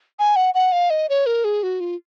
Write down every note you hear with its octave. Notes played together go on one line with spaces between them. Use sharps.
G#5
F#5
F#5
F5
D#5
C#5
A#4
G#4
F#4
F4